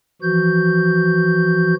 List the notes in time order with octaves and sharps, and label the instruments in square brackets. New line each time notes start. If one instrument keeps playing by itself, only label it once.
[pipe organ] E3 F3 F#4 G6